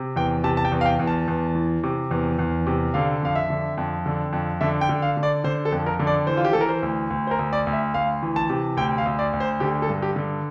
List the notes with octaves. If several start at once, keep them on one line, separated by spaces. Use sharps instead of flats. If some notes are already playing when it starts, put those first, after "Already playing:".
Already playing: C3
E2 G5
C3 A5
A5
G5
E2
F5
G5
E2
A5
E2
E3
C3
E2
E2
C3
D3 F5
F2 F5
E5
D3
F2
D3
F2
D3 E5
G5
D3
F5
D3
D5
D3 C5
A4
F2
A#4
D3
D5
E3 C5
F4
G4
E3 A4
A#4
C5
D2
D2
C5
A#4
D2
D5
D2
E5
D2 F5
E3
A5
C3
D2 G5
F5
D2
D5
D2
C5
D3 G4
A4
G2
G4
D3